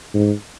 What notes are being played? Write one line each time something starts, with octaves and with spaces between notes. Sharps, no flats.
G#2